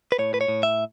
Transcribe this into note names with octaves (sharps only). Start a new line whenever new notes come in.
B4
A2 C#5
B4
C#5
A2
E5